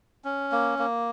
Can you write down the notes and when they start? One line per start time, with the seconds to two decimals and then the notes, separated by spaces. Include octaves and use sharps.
0.24 C#4
0.52 A#3
0.79 A#3